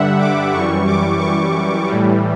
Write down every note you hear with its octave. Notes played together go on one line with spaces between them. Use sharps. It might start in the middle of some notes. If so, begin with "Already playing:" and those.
Already playing: G2 D3 G3 E5 F#5
D6
F#2 E3 G3 C#6
D6
C#6
A2 E3 G3